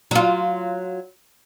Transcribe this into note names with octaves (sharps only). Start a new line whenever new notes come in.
F#3 F4